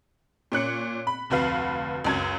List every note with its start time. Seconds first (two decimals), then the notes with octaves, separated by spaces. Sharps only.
0.52 A#2 C#4 F#6 C#7
1.07 B5
1.30 F1 D2 F#4 B4 F5
2.04 C#2 F#2 G#6